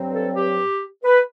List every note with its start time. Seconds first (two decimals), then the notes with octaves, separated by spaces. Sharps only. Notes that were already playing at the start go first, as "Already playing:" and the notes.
Already playing: G2 F#3 C4
0.13 A4
0.35 G4
1.04 B4